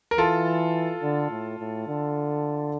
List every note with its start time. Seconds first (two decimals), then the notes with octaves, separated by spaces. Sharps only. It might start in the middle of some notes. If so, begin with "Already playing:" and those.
0.11 A#4
0.18 E3 F4 A4
1.03 D3
1.31 A2
1.59 A2
1.88 D3